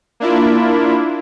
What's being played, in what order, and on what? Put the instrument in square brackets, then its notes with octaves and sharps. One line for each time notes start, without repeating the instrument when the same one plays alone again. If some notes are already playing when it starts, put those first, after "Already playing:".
[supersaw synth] A#3 D4 E4 F4